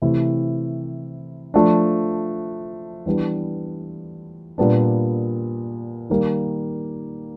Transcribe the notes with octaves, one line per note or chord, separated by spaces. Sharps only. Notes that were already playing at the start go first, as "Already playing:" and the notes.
C3 E3 A3 C4 E4
F3 A3 D4
E3 G3 B3 D4
A#2 G3 B3 D4
D#3 G3 A#3